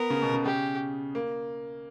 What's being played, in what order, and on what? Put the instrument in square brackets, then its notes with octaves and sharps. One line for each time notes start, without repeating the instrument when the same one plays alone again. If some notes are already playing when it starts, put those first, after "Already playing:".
Already playing: [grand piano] B3 [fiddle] A#4
[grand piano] C#3
B2
C#3
[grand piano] C#3 [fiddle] G4
[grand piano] A#3